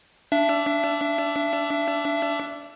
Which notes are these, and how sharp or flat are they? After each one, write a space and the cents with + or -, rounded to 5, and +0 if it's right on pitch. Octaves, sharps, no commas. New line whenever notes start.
D4 -10 E5 +25